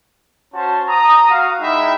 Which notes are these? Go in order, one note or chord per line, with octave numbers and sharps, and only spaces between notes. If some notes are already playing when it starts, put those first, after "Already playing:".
C#4 F#4 C5 A5
A#5 D#6
F#4 F5
G#3 D#4 E4 E5 G5 B5